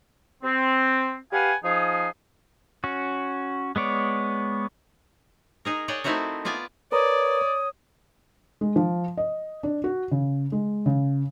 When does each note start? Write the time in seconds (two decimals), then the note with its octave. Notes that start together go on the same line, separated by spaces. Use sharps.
0.43 C4
1.32 G4 B4 F5 F#5 G#5
1.64 F3 D#4 G#4
2.84 C#4 F#4
3.76 G#3 B3 C#5 D5
5.65 D#4 G#4 A#4
5.88 G#4 C#5 D5 F#5 G5
6.04 A3 C4 D#4 E4 F#4 A#4
6.45 B3 F4 D5 G#5
6.92 A#4 B4 C#5 D5 A#5 D#6
8.61 G#3
8.76 F3
9.17 D#5
9.63 D4
9.84 F#4
10.11 C#3
10.52 G#3
10.86 C#3